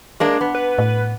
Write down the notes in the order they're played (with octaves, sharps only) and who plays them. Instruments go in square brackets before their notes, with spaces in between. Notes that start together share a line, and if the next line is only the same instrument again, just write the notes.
[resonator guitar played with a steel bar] G#3 A#3 D4
B3
[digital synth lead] B4
[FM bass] A2